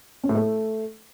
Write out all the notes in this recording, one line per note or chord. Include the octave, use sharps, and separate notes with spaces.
C#4
A2
A3